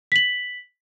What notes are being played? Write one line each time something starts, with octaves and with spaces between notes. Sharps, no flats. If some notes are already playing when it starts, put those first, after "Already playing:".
B6 F#7